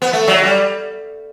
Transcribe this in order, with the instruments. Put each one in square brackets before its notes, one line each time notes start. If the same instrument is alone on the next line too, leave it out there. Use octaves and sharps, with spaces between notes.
[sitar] B3
A3
F#3
G3